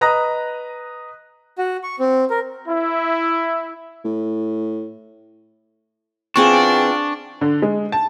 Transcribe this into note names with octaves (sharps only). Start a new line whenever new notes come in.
B4 D#5 A#5 D#6 F#6 A#6
F#4
C#6
C4
A#4
E4
A2
E3 C4 D4 F4 G#4 F#5 G5 C#6
D3
G#3
A5